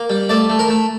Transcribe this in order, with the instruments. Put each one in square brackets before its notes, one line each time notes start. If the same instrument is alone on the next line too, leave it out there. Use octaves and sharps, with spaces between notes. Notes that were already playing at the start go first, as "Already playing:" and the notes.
Already playing: [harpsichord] A#3
G3
A3 D5
A3
A#4
A3